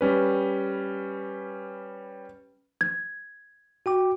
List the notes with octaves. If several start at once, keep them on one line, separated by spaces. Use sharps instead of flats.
G3 C#4 B4
G#6
F#4 G5 D6